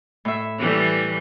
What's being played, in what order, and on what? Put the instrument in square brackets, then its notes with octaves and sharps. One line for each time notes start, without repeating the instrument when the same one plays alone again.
[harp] A2 E5
[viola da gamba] E3 G3 A3